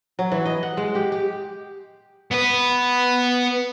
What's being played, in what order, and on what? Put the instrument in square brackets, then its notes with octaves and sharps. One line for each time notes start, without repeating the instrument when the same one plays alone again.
[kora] F#3
E3
D#5
F#5
G#3
G4
G4
[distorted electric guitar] B3 B4